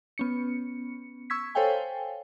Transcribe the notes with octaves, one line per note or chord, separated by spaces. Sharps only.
B3 C#4 C#7
C#6 E6 G#6 B6
A4 C5 C#5 F5 G5 G#5